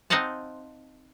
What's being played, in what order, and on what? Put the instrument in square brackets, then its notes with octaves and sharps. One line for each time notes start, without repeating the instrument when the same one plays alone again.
[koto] C4 D#4 D#5 F5 F#5 A5